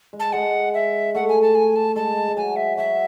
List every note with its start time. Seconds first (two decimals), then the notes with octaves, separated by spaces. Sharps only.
0.13 G#3
0.20 A5
0.33 G#3 F#5
0.74 E5
1.15 A3 F#5
1.29 G#5
1.42 A5
1.55 G#5
1.76 A5
1.96 G#3 A5
2.28 G#3
2.37 F#3 G#5
2.56 E5
2.77 F#3 E5